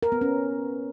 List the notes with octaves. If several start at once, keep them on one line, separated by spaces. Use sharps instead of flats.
A#4
B3
C#4